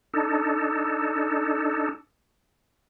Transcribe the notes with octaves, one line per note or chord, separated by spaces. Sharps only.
D4 D#4 A4